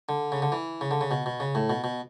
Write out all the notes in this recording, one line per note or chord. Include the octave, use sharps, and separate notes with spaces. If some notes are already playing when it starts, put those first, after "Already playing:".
D3
C#3
D3
E3
C#3
D3
C#3
B2
B2
C#3
A2
B2
B2